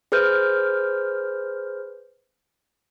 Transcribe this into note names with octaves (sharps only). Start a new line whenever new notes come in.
G#4 B4 C5 F6 G6